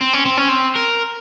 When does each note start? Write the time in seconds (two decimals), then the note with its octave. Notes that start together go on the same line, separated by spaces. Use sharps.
0.01 C4
0.13 C#4
0.25 C4
0.37 C#4
0.49 C4
0.76 A#4